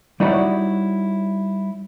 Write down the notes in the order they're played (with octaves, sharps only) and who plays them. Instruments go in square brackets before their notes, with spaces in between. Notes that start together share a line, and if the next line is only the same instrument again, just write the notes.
[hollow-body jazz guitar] G3 D#4 E4 F#4 C#5 D5